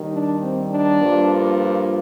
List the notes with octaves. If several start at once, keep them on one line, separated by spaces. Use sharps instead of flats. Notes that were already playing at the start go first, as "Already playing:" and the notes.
Already playing: D#2 D#3 G3
D4
C4
D4
G2 F3 A#3
F4